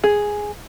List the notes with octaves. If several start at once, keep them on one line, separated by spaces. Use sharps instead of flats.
G#4